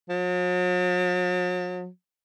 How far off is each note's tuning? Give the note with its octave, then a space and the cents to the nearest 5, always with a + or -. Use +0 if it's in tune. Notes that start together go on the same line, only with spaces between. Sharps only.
F#3 -45